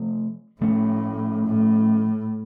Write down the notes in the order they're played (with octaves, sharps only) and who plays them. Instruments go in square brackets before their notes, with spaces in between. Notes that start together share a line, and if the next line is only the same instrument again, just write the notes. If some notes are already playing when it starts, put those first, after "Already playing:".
Already playing: [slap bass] C3 F3 A3
[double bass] A2 [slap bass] F3 A3 C#4
[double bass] A2